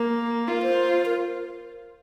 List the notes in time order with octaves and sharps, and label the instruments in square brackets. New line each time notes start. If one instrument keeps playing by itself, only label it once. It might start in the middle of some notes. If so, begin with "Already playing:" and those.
Already playing: [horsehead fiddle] A#3 [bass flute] A#4
[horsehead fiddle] F4 [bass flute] A#4
[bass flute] C5
A#4